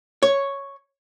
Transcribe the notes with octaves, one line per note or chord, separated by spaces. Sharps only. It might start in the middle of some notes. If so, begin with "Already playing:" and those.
C#5